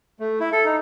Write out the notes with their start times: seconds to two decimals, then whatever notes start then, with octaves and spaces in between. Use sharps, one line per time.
0.20 A3
0.40 E4
0.52 A4
0.65 D#4